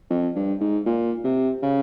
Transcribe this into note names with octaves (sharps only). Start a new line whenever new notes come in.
F2
G2
G#2
A#2
C3
C#3